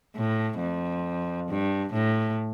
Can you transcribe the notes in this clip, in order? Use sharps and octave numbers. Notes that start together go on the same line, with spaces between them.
A2
F2
G2
A2